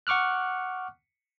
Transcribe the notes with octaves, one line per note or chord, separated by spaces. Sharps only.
F#5 C#6 D6 F6 F#6